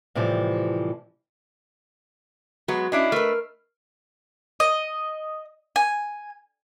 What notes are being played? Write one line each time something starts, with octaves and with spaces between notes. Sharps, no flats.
A2 C3 E3 F3 G3
F#3 G#3 B3 F#4
C#4 D4 E4 D#5 C7 D7
A3 A#4 B4 F6
D#5
G#5